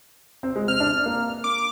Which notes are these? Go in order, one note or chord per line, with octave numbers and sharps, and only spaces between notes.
C4
G#3
C4 F6
D4
A#3
D6